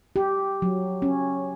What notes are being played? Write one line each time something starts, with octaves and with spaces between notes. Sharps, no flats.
G4
F#3
C#4